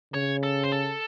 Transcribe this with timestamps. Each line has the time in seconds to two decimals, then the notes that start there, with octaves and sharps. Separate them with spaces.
0.14 C#3 C#5
0.43 A4
0.63 C5
0.72 A4